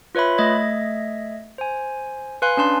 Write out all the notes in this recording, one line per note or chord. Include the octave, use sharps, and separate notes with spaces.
F4 B4 C#5 E5 B5
A3 D#5 E5 G#6
C5 G#5
B4 F5 G#5 C6 F#6
C#4 D4 A5 C6